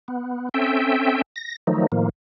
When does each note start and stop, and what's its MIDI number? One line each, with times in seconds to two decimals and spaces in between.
0.08 0.49 59
0.54 1.22 60
0.54 1.22 61
0.54 1.22 69
0.54 1.22 76
0.54 1.22 79
1.36 1.56 94
1.67 1.87 51
1.67 1.87 53
1.67 1.87 54
1.67 1.87 57
1.67 1.87 63
1.92 2.09 45
1.92 2.09 51
1.92 2.09 53
1.92 2.09 58